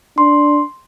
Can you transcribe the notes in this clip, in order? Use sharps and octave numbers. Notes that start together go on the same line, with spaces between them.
D4 C6